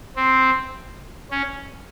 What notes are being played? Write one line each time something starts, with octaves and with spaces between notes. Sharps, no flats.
C4
C#4